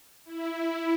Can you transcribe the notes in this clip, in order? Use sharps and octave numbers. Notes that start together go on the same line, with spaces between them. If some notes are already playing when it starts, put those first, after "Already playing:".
E4